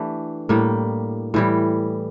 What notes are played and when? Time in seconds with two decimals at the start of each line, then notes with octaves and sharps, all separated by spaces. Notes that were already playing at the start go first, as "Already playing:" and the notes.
Already playing: E3 A3 D4 G4
0.49 A2 G3 A#3
1.34 A2 E3 G3